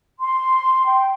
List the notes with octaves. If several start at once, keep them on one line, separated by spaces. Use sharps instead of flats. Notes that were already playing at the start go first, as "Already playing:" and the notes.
C6
G5